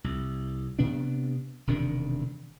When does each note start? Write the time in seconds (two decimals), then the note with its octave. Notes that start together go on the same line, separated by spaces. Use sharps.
0.04 C2
0.79 C3 B3 D4
1.67 E1 C3 D#3 D4